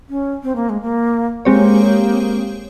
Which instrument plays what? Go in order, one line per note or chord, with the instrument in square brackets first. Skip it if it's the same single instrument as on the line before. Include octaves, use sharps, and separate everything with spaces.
[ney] C#4
C4
A#3
G#3
A#3
[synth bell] G#3 C4 G4 C#5 [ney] A#3